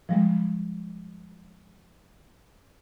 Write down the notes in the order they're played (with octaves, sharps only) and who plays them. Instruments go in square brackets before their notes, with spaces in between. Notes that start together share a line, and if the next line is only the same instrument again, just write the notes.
[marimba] F3 G3 G#3